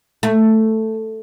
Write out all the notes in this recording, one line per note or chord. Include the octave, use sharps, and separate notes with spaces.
A3